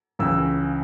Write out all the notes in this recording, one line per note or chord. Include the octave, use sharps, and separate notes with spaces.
C#2 C#3 E3 E6